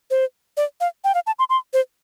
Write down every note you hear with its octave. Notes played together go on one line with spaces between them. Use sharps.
C5
D5
F5
G5
F5
A5
C6
C6
C5